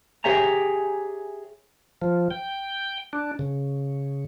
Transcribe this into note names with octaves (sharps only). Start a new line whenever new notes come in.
G4 G#4 C#5 E5 G#5 A#5
F3
G5
D4
C#3